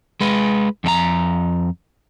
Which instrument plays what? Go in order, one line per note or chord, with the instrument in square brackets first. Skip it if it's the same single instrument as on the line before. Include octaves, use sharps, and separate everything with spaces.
[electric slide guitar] G#3 B4
F2 D4 A#5